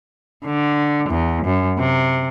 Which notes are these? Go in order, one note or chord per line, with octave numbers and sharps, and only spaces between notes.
D3
E2
F#2
C3